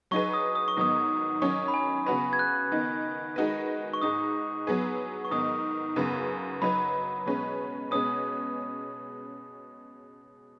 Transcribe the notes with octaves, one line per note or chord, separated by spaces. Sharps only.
F#3 D#4 G#4 B4 C#6
D#6
D#6
C#6
G#2 D#3 F#3 B3 D#6
D#3 F#3 C#4 C#6
B5
G#5
C#3 B3 F#4 B4 B5
G#6
F#6
D#3 B3 D#4
D#3 G#3 D#4 F#4 B4
C#6
G#2 G#3 D#4 D#6
F#3 B3 G#4 B4
C#6
G#2 D#3 B3 D#6
F#2 C#3 B3 G#4 B4
F#3 D#4 B4 B5
B2 G#3 C#4 B4
B2 G#3 C#4 B4 D#6